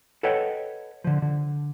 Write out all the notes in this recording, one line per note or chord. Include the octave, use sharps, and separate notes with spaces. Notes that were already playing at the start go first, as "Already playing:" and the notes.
A4 B4 C#5 D#5 F#5 G5
D3 F3
D3